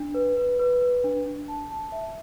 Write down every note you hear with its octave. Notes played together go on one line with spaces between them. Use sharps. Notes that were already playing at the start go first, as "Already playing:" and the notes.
Already playing: D4
B4
B4
B4
B4
D4
D4
A5
A5
E5